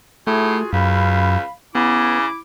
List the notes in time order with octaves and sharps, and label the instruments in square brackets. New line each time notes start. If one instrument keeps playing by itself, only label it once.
[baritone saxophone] A2 [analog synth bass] A3 [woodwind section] F4 F#4 G#4
[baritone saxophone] C#2 [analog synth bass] F#2 [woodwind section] F5 B5
[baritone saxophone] C#3 [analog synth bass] B3 [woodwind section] E4 D6